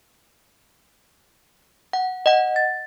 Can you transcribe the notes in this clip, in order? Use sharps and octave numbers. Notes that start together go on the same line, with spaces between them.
F#5
D#5 F#5
A6